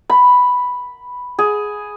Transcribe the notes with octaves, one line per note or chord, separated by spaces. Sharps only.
B5
G#4